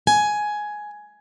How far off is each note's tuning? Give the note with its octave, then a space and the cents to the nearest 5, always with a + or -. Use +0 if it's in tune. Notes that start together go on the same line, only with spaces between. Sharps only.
G#5 +10